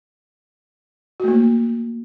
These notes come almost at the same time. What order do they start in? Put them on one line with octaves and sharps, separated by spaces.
F#4 A3 A#3